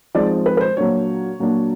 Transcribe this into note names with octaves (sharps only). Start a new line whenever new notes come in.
F3 G#3 C4 D#4 D5
B4
B4
C5
A#2 F#3 A#3 D4 C#5
A#2 F#3 A#3 D4